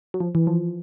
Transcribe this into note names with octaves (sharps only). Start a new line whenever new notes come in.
F#3
F3
E3
F3